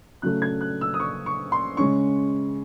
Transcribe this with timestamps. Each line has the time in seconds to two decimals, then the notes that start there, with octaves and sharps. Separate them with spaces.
0.22 C#3 F#3 A3 F#6
0.42 G#6
0.61 F#6
0.81 E6
0.94 D#6
1.00 C#6
1.26 C#6
1.52 C6
1.77 C#3 G#3 C#4 C#6